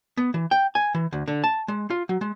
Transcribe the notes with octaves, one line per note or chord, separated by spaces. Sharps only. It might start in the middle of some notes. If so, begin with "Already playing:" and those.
B3
E3
G5
G#5
E3
D2
D3
A5
G#3
F4
F#3
G#3